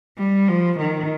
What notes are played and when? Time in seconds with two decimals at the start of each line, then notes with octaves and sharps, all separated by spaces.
0.18 G3
0.49 F3
0.79 D#3